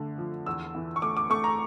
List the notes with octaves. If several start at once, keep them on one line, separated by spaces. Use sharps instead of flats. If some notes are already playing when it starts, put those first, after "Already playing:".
Already playing: D3 A3
F3
E2 E6
E3
C#6
A3 D6
D6
A3 C#6
A#5